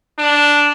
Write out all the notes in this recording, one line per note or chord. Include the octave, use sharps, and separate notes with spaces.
D4